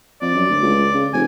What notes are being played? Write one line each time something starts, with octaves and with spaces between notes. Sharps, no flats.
F2 D5
F#2
D2
C#2
C#3
F1 G#5